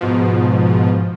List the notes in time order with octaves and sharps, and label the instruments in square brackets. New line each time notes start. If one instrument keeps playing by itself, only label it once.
[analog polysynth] G#2 B2 F3